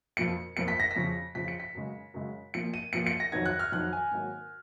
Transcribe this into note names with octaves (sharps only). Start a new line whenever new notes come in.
F2 F3 A#3 C#7
F2 F3 A#3 C#7
B6
A#6
B6
F2 C#3 F3
F2 C#3 F3 B6
C#7
B6
F#2 C#3 G#3
F#2 C#3 G#3
A#2 F3 A#3 C#7
D#7
A#2 F3 A#3 C#7
C#7
A#6
F2 D#3 F#3 G#6
F#6
F6
F2 D#3 F#3 F#6
G#5
G#2 D#3 F#3 A#3